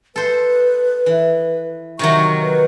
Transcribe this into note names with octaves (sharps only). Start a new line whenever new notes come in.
A4 B4 C5
E3
C3 D#3 F#3 C#6
B4